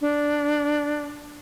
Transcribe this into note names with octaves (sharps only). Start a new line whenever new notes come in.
D4